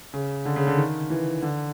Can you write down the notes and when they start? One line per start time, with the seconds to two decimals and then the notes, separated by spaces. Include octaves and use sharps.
0.14 C#3
0.45 D3
0.56 C#3
0.67 D3
0.77 D#3
1.10 E3
1.42 D3